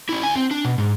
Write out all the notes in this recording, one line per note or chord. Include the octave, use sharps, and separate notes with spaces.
C#4 E4
D2 G#5
C4
D4
B2
G#2